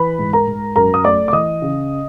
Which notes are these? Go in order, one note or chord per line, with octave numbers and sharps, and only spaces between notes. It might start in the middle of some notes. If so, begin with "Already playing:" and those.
Already playing: E3 B4 B5
G#2
A#4 A#5
G#2
F#2 A#4 A#5
D#6
A3 D5 D6
D6
E3 D#5 D#6
C#3